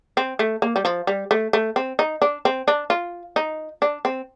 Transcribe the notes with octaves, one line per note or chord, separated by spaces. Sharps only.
C4
A3
A#3
G3
F3
G3
A3
A3
C4
D#4
D4
C4
D4
F4
D#4
D4
C4